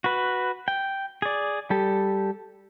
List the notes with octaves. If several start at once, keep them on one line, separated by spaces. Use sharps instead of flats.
F#4 B4
G5
G#4 D5
G3 G4 A4